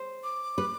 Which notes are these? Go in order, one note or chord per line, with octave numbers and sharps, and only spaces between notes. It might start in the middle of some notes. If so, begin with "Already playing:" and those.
Already playing: C5
D6
B4